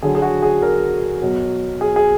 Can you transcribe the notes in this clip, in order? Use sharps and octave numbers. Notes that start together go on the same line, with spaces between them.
D3 F#3 G#4
G#4
F#4
G#4
A#4
B2 F#3
G#4
G#4